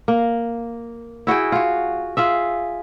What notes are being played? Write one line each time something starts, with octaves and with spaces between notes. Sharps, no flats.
A#3
E4 F#4 G#4 G5
F4 F#4
F4 G#4 E5